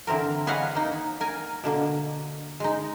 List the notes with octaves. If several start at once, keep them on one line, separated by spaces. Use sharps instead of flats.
D3 E3 C4 A#4
G#4 B4 C#5 D#5 F5 F#5
A#3 D#4
A#4 G#5
B2 D3 A#3
G#3 D#4